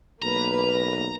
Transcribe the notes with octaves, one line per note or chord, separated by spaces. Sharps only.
B1 A#3 B4 A#5